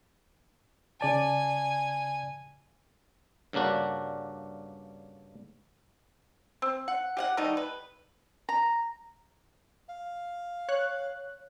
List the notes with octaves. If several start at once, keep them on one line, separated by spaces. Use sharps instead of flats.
C#3 D5 G#5 A5
G2 C#3 A#3 D4 F#4
C4
F#5
G4 F5 F#5
D#3 G3 A3 D#4
B4
A#5
F5
C#5 F#6